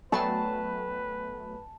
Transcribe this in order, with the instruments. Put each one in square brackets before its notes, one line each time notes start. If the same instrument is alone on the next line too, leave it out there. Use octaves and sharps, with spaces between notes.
[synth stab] F#3 A3 B3 [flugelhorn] B4 [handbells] G5 B5 C#6 [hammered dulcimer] A5